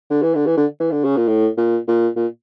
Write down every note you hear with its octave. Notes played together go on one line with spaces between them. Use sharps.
D3
E3
D3
E3
D3
E3
D3
C#3
A#2
A2
A#2
A#2
A#2